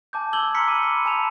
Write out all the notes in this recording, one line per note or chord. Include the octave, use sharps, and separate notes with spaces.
G#5 A5 D6 G6
E6 G#6 F#7 G7
G#5 A#5 C6 F6 B6 C#7
B5 D6 D#6 D#7
G#5 A5 B5 E7 F7